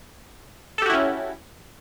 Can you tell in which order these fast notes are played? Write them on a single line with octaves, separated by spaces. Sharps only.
A4 G4 F#4 E4 C#4